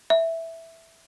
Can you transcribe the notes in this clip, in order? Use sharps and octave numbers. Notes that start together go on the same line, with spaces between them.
E5